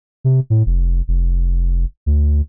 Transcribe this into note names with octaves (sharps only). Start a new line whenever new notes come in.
C3
A2
F1
F1
D2